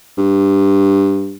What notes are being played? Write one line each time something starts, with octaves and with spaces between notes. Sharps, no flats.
G2